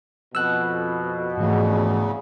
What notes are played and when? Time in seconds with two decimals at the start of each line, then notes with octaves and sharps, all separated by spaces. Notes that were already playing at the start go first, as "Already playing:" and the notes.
0.35 F2 B2 E6 F#6
1.37 E2 G#2 C#3 E3 A3